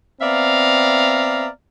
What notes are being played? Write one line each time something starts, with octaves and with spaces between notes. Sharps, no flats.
B3 C4 D5 E5 F5 A#5